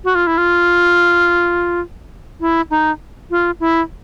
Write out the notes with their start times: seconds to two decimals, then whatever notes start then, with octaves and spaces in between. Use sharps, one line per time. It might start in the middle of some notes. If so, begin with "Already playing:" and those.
0.04 F#4
0.15 F4
0.27 E4
0.38 F4
2.41 E4
2.70 D#4
3.30 F4
3.60 E4